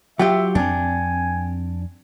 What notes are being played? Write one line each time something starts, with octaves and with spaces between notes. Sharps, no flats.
F#3 F4 G4 E5 G5
F2 C4 D4 G#5